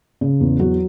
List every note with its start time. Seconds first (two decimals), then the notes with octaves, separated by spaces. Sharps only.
0.21 C#3
0.40 E2
0.59 F#3 F#4